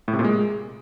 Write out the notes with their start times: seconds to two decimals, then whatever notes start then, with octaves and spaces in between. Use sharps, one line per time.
0.08 A2
0.13 C3
0.19 A#2
0.24 G#3